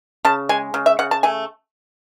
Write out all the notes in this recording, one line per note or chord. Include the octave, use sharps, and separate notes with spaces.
C#3 A5
G#3 G#5
C#3
E5
C#3 F#5
A5
A3 G#5